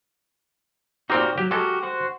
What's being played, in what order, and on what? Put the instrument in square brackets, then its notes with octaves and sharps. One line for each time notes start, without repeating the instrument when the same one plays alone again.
[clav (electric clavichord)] A#2 C4 D#4 [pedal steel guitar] F#4 G4 A#4
[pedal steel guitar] F#3 [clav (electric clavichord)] G4
[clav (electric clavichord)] F#3 G#3 A4 [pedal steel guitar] F#4 G4 A#4
[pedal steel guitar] F#4 C5 F#5